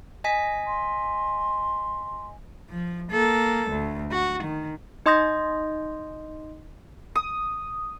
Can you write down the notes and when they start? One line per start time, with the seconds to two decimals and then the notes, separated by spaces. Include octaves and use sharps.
0.24 D#5 G#5 B6
0.66 C6
2.70 F3
3.12 A#3 A4
3.71 D2
4.11 F#4
4.44 D#3
5.06 D#4 D#5 C6 D#6 G6 A#6
7.15 D#6